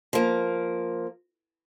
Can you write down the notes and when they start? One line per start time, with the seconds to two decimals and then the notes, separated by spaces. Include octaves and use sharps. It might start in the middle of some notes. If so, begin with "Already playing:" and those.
0.13 F3 A#3